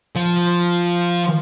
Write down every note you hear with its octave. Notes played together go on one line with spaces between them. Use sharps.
F3